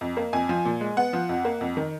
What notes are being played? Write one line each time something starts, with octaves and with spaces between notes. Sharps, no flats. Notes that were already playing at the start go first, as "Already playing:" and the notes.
F2
A#3
F2 G#5
F3
A#2
G#3
B3 F#5
F3
F2
A#3
F2
D#3